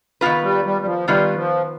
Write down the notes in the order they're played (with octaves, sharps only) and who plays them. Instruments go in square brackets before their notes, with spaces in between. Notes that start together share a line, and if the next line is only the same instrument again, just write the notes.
[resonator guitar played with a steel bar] D#3 B3 F4 B4
[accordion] G3
G3
G3
F3
[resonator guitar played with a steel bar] D#3 B3 F4 B4 [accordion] G3
[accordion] F3